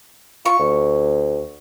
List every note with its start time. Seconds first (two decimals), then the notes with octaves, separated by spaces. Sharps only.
0.46 F4 C#6
0.59 D2